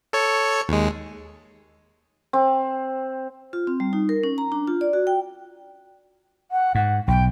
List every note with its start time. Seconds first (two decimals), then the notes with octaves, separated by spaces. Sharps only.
0.13 A4 C#5 C#7
0.69 D#2 G#3
2.33 C4
3.53 F4
3.67 C4
3.80 G3
3.93 D#4
4.09 A#4
4.23 C#4
4.38 A#5
4.52 D4
4.67 F4
4.81 D5
4.93 F#4
5.07 G5
6.51 F#5
6.75 G#2 F#5
7.08 B1 G5